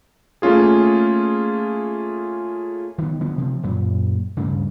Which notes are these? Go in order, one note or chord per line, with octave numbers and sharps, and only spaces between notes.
A3 A#3 C#4 F4 G#4
D#3 B3
D3 F3 B3
C3 F3
F#2 A#2
D2 G2 C#3